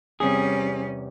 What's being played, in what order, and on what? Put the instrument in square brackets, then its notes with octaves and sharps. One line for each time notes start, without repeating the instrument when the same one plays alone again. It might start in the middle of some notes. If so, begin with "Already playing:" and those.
[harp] E2 C3 [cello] G3 C#4 [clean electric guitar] G#4